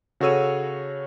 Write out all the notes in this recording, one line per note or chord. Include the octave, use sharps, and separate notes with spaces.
C#3 F#4 A4 C#5 E6 D#7